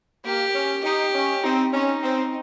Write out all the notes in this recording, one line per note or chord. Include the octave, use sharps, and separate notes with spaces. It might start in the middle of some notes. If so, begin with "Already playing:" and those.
A#3 G4
C#4
D#4 G4
C#4
C4 D#4
C#4 D#4
C4